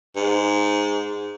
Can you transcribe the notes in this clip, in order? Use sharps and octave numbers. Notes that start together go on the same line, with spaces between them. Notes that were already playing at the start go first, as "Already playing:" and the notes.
G#2